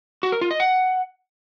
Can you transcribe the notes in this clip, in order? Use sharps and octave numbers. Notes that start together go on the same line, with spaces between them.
F#4
A#4
F4
D#5
F#5